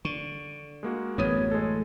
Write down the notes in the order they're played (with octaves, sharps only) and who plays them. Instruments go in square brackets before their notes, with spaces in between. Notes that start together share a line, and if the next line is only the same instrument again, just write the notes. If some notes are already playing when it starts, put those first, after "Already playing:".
[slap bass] D3 [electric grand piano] C#6
[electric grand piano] G#3 A#3 F#4
[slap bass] A1 F#2 [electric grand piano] B3 D#6 D#7 [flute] C#5
[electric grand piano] G#3 A4